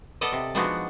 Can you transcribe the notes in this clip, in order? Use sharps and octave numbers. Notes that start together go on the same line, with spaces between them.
B3 A4 D5 D#5
C3
F3 G#3 B3 D4 D#4 F#4